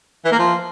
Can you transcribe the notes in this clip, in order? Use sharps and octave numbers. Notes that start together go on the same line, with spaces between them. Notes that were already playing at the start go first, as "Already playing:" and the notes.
E3
A#3
F3